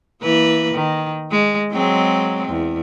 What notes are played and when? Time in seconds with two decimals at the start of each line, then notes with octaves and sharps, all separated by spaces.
0.22 E3 A#3 B4
0.75 D#3
1.31 G#3
1.72 F#3 G#3 C4
2.48 E2